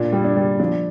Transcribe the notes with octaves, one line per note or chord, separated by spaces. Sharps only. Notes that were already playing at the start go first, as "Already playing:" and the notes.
Already playing: A#2 D4
G3
D4
G3
F3 D4